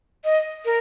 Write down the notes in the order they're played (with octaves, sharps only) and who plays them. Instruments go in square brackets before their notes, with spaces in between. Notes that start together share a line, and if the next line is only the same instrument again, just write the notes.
[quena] D#5
A#4